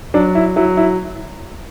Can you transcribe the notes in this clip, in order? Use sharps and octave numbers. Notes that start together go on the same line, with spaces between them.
F#3 D4
E4
F#3 E4
E4